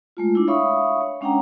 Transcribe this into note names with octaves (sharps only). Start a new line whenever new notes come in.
G#3 A3 F4
D4 E4
C#5 E5 F5 B5 C#6 D#6
C#5
G#3 C#4 D4 F#5 G5 A#5